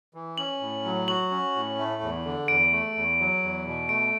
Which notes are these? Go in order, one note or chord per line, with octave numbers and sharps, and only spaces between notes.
E3
C#4 F#7
A2
F#3
F#4 F#7
C#4
A2
A3
E2
D3
E2 D7
A3
E2
F#3
E2
B2
A3 D7